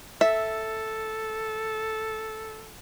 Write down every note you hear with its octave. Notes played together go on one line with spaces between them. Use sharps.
A4 E5